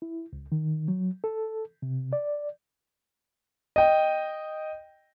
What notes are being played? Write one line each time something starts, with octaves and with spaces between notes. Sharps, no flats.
E4
C#2
D#3
F#3
A4
C3
D5
D#5 G5